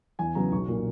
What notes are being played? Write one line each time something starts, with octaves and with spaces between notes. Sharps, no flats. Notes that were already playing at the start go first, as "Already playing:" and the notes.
E2 G#5
C#3 F#3 B3 A#5
B1 C#6
A#2 A#3